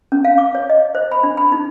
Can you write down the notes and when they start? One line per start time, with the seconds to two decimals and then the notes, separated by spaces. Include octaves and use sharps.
0.12 C#4
0.24 F5
0.38 D6
0.55 C#5
0.70 D#5
0.95 C5
1.12 B5
1.23 D4
1.37 B5
1.52 D#4